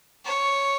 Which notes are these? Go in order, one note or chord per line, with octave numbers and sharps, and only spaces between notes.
C#5